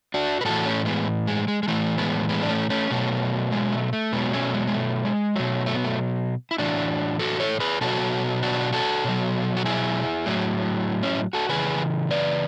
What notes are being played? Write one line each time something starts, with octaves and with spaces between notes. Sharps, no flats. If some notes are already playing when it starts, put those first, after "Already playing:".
D4 F#4
B4
A2 E3 F#4 A4
A3 C#4
G#3 B3
G#3
G#3
G#3
A2 E3 A3
G#3 B3
G#3 B3
D4
A3 C#4
A3 C#4
B2 F#3 A3
G#3
A3
A3
B2 F#3 G#3 B3
A3 C#4
G#3 B3
G#3
A3
G#3
B2 F#3 A3
A3
B3
A3
E4
A2 E3 D4 F#4
F#4 A4
A4 C#5
G#4 B4
B2 F#3 F#4 A4
D4 F#4
F#4 A4
B2 F#3
F#4
E4 G#4
A2 F#3
C#4 E4
F#4 A4
C#3 E3 G#4 B4
B4 D5